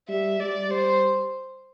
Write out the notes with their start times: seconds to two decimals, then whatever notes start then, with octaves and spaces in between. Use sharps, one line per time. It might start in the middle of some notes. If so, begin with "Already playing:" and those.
0.09 G3 E5
0.39 G3 D5
0.69 G3 C5